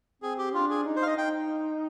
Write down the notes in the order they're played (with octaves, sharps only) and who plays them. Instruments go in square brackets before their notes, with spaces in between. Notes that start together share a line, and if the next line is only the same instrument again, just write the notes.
[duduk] C4 [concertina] G#4
[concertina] G4
[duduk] D4 [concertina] F4
[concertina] G#4
[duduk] D#4
[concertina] C5
F5
D#5
[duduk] D#4 [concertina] G5